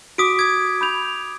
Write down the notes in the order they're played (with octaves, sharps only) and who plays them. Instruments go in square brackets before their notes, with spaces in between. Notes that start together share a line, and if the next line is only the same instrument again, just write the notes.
[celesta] F#4 B6 [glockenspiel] D6 D#6 D7
[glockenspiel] D#6 G#6
[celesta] B5 G6 F7